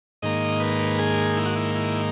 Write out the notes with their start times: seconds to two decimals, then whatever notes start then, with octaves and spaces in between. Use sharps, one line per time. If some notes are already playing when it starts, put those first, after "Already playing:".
0.22 G#2 D#3 A#3 D#5
0.60 B4
0.99 G#4
1.37 E4
1.45 F#4
1.56 E4
1.75 E4